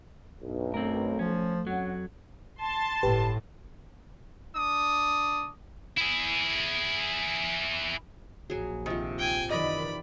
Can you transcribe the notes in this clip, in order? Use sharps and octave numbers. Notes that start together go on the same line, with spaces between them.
B1 G2
A3 C4 A#4
F3 C#4
F2 F#3 C#4 F#5
A5 C6
G1 A2 G4 B4
D4 D#6
E4 G#4
A#1 F#3 G#4
C3 D#3 F3
G5 G#5
F#2 D#3 E3 D5 D#5 B5